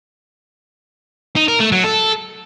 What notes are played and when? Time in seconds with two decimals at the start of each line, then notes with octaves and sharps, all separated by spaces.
1.36 D#4
1.48 A#4
1.60 A3
1.72 F#3
1.84 A4